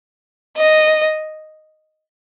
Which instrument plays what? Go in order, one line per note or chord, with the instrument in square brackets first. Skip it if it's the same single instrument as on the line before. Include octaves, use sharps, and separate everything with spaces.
[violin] D#5